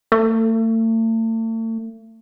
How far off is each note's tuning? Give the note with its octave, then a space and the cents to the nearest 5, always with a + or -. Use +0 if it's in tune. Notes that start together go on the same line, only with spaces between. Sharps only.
A3 +40